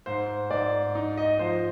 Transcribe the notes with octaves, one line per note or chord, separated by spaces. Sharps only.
G#2 C5
G#2 D5
D#4
D#5
F3 C5